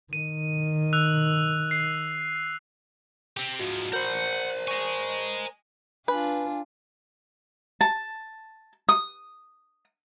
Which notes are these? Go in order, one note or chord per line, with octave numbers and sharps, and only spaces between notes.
D#3 D#7
E6 F#6 F7
C7
C4 G4
G#2 F3 F#4
A#4 C5 F#5 G6
D#5 G#5 C#6
D4 F4 B4 G#5
A5
D#6